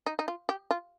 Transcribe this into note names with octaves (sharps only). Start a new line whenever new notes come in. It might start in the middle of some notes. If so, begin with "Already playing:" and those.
D#4
D#4
F4
G4
F4